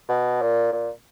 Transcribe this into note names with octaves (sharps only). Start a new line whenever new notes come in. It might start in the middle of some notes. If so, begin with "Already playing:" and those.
B2
A#2
A#2